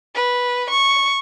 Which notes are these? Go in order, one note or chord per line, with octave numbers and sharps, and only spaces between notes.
B4
C#6